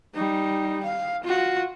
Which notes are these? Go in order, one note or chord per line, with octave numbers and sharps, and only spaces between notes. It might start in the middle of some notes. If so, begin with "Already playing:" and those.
G3 D#4
F5
F4 F#4